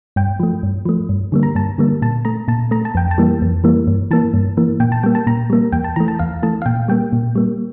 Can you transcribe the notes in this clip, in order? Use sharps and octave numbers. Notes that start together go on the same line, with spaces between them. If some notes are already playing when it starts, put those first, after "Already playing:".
G2 G5
F3 A3
G2
F3 A3
G2
D3 G3 A#3
A#5
G2 A5
D3 G3 A#3
A#2 A5
A3 A#5
A#2 A5
A3 A#5
A5
F2 G5
A5
E3 G3 A#3
F2
E3 G3 A#3
G2
E3 A#3 A5
G2
E3 A#3
A#2 G5
A5
G3 A#3 G5
A5
A#2 A#5
G3 A#3
E2 G5
A5
E3 A3 A#5
A5
E2 F5
E3 A3 A5
F5
A#2 G5
G3 A#3 G5
A#2
G3 A#3